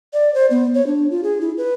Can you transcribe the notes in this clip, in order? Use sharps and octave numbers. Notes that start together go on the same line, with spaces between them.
D5
C5
B3
C#5
D4
F4
G#4
E4
B4